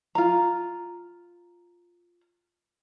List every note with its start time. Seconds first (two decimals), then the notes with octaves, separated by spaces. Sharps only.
0.15 F4 A#5